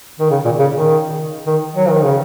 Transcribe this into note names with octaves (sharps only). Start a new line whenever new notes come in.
D#3
C#3
A#2
C#3
D#3
D#3
F#3
D#3
C#3